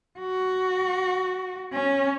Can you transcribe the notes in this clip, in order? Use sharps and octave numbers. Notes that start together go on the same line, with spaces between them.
F#4
C#4